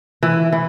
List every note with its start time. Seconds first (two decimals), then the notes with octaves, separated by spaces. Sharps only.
0.23 E3
0.53 E3